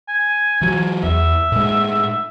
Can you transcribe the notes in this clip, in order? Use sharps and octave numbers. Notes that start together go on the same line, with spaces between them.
G#5
E3 F#3
E2 E5
A2 G#3